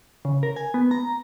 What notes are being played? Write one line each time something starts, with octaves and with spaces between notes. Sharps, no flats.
C#3
A#4
G#5
B3
A#5